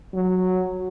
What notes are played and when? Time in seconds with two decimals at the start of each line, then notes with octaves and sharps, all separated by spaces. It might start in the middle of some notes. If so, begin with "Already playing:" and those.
0.14 F#3